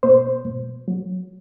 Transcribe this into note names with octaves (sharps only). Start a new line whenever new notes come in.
B2 C5
B2
F#3